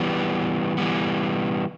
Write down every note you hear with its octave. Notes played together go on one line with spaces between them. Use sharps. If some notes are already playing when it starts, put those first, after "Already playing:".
Already playing: E3 G3 B3
E3 G3 B3